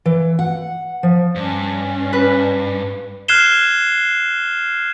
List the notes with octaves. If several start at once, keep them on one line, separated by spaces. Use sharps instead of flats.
E3
F#5
F3
G2 C#4
B4
F6 F#6 G#6 C7 E7 G7